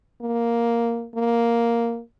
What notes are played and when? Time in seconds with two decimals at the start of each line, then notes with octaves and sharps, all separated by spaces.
0.22 A#3
1.15 A#3